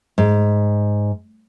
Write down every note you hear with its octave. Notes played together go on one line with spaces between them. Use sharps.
G#2